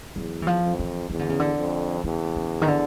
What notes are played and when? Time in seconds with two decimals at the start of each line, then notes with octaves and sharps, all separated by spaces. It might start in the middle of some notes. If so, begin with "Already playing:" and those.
0.15 E2 F#3
0.42 E3
0.47 F3
0.62 F2
0.79 E3
1.10 E2 D#3
1.19 D3
1.29 C#3
1.39 D3
1.57 F2
2.04 E2 C#3
2.36 C#3
2.62 D#3
2.68 D3